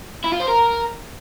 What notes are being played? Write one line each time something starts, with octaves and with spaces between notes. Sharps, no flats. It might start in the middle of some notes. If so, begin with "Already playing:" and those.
E4
F4
C5
A#4